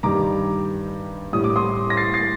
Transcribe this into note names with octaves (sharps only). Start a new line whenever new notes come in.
G2 D#3 G3 A#5 D6
A2 G3 D#6
D6
C6 D#6
A#6
A6 C7
A6 C7